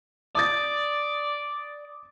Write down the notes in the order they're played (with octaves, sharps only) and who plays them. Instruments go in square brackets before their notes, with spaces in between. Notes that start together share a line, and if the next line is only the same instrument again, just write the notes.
[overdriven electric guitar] D5 [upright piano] D6 D#6 A6